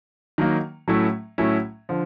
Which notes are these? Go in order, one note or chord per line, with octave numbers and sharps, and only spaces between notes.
D#3 F#3 A#3
A2 F#3 A3 C#4 E4
A2 F#3 A3 C#4 E4
D3 F3